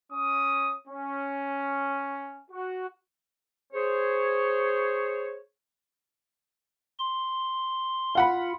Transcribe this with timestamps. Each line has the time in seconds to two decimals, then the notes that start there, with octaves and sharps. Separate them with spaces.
0.11 C#4 D#6
0.87 C#4
2.50 F#4
3.73 G#4 C5 C#5
6.99 C6
8.15 F4 F5 F#5 B5